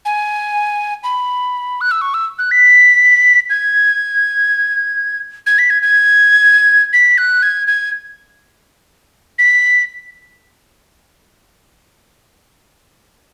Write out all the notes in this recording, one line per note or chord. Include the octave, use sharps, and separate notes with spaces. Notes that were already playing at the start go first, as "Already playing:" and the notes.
G#5
B5
F#6
E6
C#6
E6
F#6
B6
G#6
G#6
B6
G#6
G#6
B6
F#6
G#6
G#6
B6